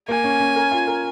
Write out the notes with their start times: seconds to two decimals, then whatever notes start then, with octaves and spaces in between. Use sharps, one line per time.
0.08 A#3 G#5
0.24 C#4
0.40 C#4
0.56 A#4
0.71 F4
0.87 A#4